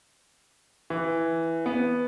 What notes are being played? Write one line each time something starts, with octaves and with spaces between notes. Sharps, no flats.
E3
B3